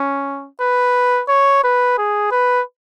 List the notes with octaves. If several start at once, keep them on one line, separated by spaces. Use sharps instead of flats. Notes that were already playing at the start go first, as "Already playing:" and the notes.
Already playing: C#4
B4
C#5
B4
G#4
B4